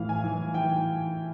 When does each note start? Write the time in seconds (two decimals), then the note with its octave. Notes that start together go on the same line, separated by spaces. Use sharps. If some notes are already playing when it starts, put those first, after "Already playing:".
Already playing: A2 E3 F5
0.09 G#5
0.24 E3
0.54 E3 G5